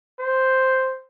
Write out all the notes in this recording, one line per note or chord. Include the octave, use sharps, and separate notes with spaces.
C5